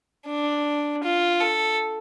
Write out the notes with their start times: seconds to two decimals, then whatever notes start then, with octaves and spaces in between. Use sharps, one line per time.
0.27 D4
1.03 F4
1.41 A4